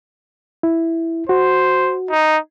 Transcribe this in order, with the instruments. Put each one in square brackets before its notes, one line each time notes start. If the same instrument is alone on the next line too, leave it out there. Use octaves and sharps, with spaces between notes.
[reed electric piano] E4
[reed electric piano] F#4 [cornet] C5
[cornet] D#4